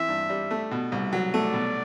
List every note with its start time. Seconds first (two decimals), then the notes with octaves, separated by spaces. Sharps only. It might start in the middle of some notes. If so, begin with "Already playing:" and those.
Already playing: E3 C4 E5
0.08 G2
0.30 G3
0.51 A3
0.71 B2
0.92 C2
1.13 F#3
1.33 A3 D5
1.53 B2